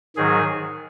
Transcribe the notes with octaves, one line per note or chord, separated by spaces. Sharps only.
G#2 D#3 F#3 G#4